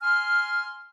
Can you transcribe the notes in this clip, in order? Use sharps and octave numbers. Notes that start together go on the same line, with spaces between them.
G#5 C6 F6